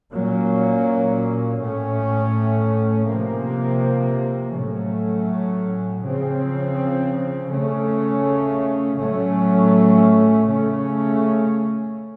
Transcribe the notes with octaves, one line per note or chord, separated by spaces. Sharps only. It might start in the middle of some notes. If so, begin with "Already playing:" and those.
A#2 F#3 A#3 C#4
A2 A3 C#4
C3 F3 A#3
A2 F#3 A3 C#4
C#3 F3 C4
C#3 A3 C#4
A2 F#3 A3 C#4
C#3 A3 C#4